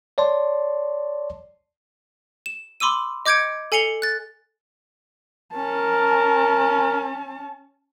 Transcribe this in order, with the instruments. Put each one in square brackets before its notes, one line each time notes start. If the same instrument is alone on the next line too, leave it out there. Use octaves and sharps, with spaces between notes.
[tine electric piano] C#5 D5 A5 C6
[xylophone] E7
B5 C6 D6 E6 D#7
D#5 D6 G6 G#6 C#7 D7
A4 G#5 C7 C#7 F7 G7
F#6 A6
[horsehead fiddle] C#4 A5 [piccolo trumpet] A#4